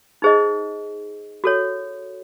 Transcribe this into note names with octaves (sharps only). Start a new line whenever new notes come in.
D#4 G#4 C5 D#5
F#4 A4 C#5